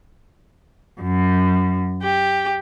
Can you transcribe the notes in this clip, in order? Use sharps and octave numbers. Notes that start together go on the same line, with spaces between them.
F#2
G4